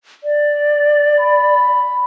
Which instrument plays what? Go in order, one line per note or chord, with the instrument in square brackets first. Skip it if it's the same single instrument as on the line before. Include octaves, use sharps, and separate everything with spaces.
[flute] D5
[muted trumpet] B5